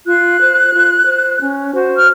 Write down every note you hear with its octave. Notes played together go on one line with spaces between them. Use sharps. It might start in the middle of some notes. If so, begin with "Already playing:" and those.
F4 F#6
C5
F4
C5
C#4
F#4 C5
F6